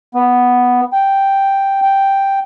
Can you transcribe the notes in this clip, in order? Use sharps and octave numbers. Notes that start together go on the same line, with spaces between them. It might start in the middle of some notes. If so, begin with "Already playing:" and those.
B3
G5
G5